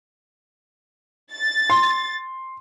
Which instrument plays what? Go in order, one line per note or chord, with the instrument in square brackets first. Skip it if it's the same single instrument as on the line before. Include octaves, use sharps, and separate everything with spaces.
[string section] A6
[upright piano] C6